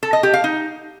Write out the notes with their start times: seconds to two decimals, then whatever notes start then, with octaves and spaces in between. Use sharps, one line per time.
0.03 A4
0.13 D#5
0.23 G4
0.34 F5
0.44 D#4